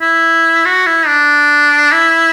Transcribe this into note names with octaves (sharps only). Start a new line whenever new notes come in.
E4
F#4
E4
D4
E4